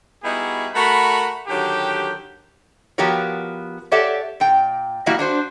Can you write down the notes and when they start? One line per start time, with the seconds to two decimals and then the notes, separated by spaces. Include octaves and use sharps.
0.24 G3 B3 D#4 E4 F#4 G#4
0.74 A3 F#4 A#4 F#5 B5
1.48 D3 D#3 F#3 G4
2.98 F3 B3 F#4 G4 A#4 C#5
3.92 G4 A4 C#5 D5 E5 F#5
4.40 A#2 G5
5.06 B2 E3 G3 A#3 E4 F#4
5.19 D4 F#4 C5